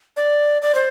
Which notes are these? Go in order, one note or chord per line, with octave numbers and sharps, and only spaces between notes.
D5
D5
C5